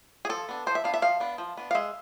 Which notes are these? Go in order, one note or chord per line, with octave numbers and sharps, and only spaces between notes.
G#4
F3 A4
B3 D4
F3 C5
E5
B3 D4 F5
E5
F3 F5
B3 D4
F3
B3 D4
F5
G#3 E5